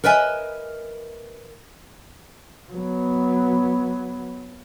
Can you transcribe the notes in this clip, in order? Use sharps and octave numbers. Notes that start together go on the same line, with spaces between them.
A#4 B4 D#5 E5 G#5
F#3 B3